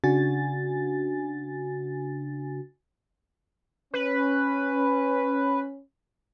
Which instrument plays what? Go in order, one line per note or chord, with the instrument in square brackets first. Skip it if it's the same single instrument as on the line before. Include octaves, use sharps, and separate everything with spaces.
[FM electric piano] C#3 D4 F#4 G#5 A6
[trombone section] C#4 [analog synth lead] B4